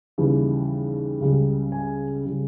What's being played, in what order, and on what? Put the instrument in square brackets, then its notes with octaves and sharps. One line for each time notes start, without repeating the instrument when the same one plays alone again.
[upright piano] D#2 C#3 E3 G3
C#2 C#3 G3
G#5
C#3 G3